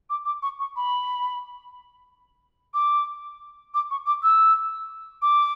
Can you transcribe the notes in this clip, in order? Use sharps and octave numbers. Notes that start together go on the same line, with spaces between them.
D6
D6
C#6
C#6
B5
D6
D6
C#6
D6
E6
D6